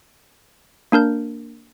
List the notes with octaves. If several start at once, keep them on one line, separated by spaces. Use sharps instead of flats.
A#3 D4 A#4 G6